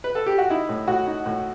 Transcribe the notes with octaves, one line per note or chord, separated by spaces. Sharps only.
B4
A4
G4
F#4
D#4 E4
A2
A2 F#4
D#4
A2